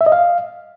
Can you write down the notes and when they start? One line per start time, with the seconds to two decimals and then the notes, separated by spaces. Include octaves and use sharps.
0.01 E5
0.06 D#5
0.12 F5